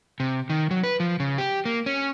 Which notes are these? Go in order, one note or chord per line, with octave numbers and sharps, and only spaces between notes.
C3
D#3
F#3
B4
F3
C#3
G4
A#3
C#4